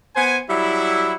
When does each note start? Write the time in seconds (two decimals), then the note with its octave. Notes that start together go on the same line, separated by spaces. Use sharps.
0.16 B3 C5 G#5
0.49 F#3 G3 E4